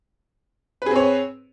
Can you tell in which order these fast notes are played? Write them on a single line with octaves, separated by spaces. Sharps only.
B4 G#4 C4 C#5